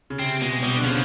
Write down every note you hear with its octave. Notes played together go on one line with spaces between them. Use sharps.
C#3
C3 C4
B2 G#3
B2 G3
D3
C#3 F3